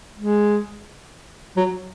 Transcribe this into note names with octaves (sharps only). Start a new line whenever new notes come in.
G#3
F#3